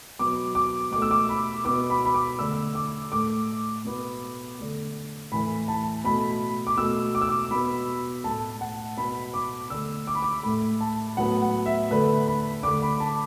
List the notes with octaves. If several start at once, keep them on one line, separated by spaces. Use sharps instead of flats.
B2 F#3 B3 D6
D6
B2 A3 D6
E6
D6
B5
B2 B3 D6
B5
B5
D6
D3 A3 E6
D6
A2 A3 D6
B2 B3
D3 A3
A2 E3 A3 B5
A5
B2 A3 B5
D6
B2 A3 E6
D6
E6
D6
B2 B3 B5
A2 A3 A5
F#5
B2 B3 B5
D6
D3 A3 E6
D6
B5
D6
A2 A3 B5
A5
A2 F#3 B3 F#5
F#5
E5
D3 A3 B4
B5
D3 A3 D6
B5
A5